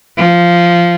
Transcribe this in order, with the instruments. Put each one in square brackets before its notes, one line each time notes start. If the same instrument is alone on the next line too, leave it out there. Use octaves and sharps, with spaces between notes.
[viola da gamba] F3